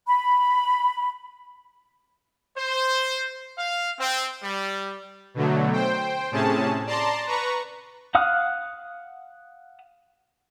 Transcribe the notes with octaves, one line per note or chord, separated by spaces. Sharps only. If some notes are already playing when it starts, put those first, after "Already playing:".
B5
C5
F5
C4
G3
B2 D3 F#3 A3
C5 G5
A2 C3 C#4 G#4 A5
D5 A5 A#5 C6
B4 A#5 C#6
F5 F#5 D#6 F6 F#6